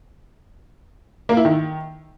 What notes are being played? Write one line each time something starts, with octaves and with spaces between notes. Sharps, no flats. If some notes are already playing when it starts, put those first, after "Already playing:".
A#3
E4
D#3